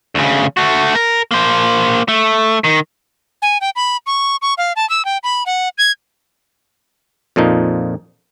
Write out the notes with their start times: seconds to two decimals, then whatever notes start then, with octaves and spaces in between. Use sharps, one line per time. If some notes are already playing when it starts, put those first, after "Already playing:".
0.15 D2 C#3
0.57 A3 F#4
0.95 A#4
1.31 A#3 C5
2.08 A3
2.64 D#3
3.42 G#5
3.61 G5
3.76 B5
4.06 C#6
4.42 C#6
4.58 F5
4.76 A5
4.90 E6
5.05 G5
5.23 B5
5.46 F#5
5.78 G#6
7.36 F2 A#2 F3 D#4